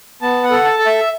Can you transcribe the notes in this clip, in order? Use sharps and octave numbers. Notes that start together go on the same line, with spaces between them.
B3 A5
F#5
A4
A5
A4
E5